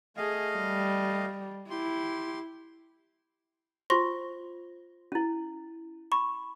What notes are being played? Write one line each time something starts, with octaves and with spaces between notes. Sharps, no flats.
A3 G#4 D#5 F5
G3
E4 G4 C6
F4 C5 C6 C#6 A#6
C#4 E4
B5 C#6